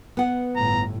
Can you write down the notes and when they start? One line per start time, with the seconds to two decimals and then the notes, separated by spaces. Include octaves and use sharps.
0.17 B3 F#5
0.56 G1 A2 A#5